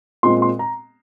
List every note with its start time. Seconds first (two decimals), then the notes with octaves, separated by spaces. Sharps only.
0.23 A#2 G#3 C4 C6
0.42 C6
0.59 A#5